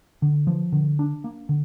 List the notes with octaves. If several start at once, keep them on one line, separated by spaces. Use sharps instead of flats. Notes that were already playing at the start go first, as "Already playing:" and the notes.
D3
F3
D3
D4
A#3
D3